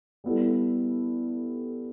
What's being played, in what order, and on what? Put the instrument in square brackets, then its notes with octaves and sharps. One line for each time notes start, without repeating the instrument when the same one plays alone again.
[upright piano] G3 B3 E4 A4